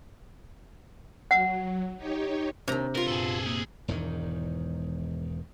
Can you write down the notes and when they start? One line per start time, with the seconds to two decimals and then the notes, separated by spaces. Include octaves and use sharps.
1.31 F#3 F#5
1.97 D#4 G4 C#5
2.68 D#2 C3 D#3 D4 A#5
2.95 B3 F4 A#4
3.08 F#2 A#2 G#4 A4
3.46 A#3 E4 G#4
3.88 E1 E2 G#2 D#3